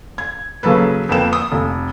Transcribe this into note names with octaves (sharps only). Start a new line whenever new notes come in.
G#6
C#3 F#3 A#3 A4 B4
F2 A#3 B3 G5 E7
D#6
F1